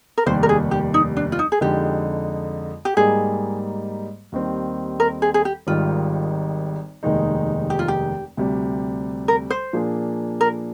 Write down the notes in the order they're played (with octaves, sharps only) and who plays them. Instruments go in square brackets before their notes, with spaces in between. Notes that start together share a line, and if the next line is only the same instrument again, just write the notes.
[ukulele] A#4
[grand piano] F1 D#2 D#3 G3 [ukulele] C5
[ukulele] A#4
G#4
G4
D#4
D4
F4
D#4
G#4
[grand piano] F2 D3 G#3 D#4 [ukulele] G4
[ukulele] G4
[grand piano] G#2 G3 A#3 D#4 [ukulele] G#4
[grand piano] D#2 D#3 G3 C4
[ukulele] A#4
G#4
G#4
G4
[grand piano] G#1 G#2 D#3 G3 [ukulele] F4
[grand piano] F1 D#2 D#3 G#3 D#4
[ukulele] G4
F4
G4
[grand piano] D2 C3 G3
[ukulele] A#4
C5
[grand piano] A#2 F3 A#3 D4 G#4
[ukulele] A#4